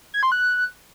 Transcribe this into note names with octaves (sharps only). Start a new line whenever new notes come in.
G#6
C6
F#6